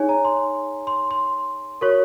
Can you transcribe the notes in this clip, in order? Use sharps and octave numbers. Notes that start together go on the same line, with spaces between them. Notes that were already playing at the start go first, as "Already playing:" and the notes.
Already playing: D#4 G#4 C#5 G#5
A#5
C6
C6
C6
F#4 A#4 C#5 C#6